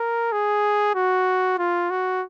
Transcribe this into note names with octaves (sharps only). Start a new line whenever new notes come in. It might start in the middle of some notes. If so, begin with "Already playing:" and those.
Already playing: A#4
G#4
F#4
F4
F#4